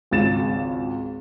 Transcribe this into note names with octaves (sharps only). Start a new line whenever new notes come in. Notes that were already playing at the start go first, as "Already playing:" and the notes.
G#1 C#2 A6 E7